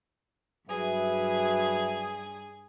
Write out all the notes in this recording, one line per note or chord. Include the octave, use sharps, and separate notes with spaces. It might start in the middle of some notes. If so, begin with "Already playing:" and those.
G2 F#3 G#4 B4 E5